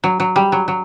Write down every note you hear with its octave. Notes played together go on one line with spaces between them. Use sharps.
F#3
F#3
G3
F#3
F#3